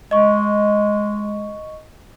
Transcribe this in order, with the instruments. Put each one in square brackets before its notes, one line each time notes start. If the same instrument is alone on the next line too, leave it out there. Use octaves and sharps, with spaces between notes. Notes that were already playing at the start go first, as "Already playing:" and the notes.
[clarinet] G#3 [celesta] D#5 C#6